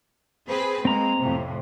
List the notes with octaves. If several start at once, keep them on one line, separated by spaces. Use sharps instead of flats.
C4 G#4 B4
G#3 A#3 C4 A#5
F2 A2 C3